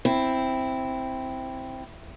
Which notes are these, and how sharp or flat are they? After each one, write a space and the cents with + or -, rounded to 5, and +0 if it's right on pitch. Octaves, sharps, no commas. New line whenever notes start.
C4 +0 E4 +0